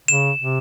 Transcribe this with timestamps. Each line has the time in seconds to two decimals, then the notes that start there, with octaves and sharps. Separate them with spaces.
0.08 C#3 E7
0.41 C3